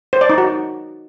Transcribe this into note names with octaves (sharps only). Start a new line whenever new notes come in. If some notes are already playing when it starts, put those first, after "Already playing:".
C5
D5
D#4
F#4